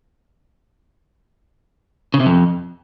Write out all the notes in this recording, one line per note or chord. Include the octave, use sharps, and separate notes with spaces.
C#3
C3
F2